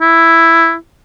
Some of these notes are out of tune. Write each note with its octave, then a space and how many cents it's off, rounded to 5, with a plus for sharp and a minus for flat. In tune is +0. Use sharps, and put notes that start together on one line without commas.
E4 +5